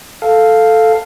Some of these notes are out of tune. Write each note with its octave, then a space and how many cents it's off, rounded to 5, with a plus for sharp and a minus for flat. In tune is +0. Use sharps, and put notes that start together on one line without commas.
A4 +0 F5 +0